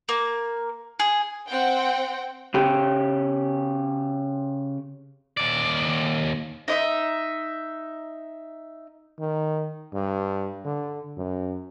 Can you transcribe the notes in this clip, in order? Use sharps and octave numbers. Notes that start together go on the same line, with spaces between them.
A#3
G#4
C4 F#5 G5
C#3 G4
D#2 D5
D#4 D#5 E5
D#3
G2
D3
F#2